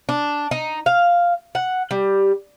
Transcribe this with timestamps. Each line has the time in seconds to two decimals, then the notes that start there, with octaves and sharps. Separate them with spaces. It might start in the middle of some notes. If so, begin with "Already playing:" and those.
0.09 D4
0.51 D#4
0.86 F5
1.55 F#5
1.91 G3